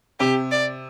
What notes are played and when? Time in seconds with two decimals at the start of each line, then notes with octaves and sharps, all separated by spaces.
0.20 C3 G4
0.51 D5